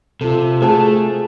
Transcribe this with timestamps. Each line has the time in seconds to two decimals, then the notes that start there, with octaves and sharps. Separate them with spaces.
0.21 C3 F4 A4
0.62 A3 F#4 G#4 C5 A5